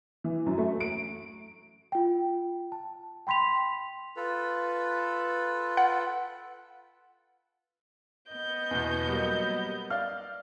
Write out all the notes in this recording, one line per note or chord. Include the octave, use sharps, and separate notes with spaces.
E3
F#2
A3
D7
F4 G5
A5
G5 B5 C6 B6 F7
F4 A4 B4
F#5
B3 D#5 G6
E2 B2
F#3 G3 A#3
D5 F5 F6